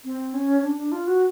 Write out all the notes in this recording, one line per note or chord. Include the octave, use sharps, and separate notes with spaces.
C4
C#4
D4
D4
F4
F#4